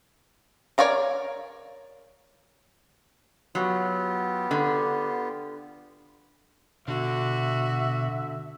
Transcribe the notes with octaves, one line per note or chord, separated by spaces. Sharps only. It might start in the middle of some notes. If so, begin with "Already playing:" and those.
A#4 C#5 D5 F5 A#5
F#3 B3 F4 G4
D3
B2 D3 F#4 E5